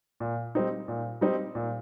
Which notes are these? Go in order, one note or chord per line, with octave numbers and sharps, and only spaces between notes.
A#2
G3 C4 D#4
A#2
G3 C4 D#4
A#2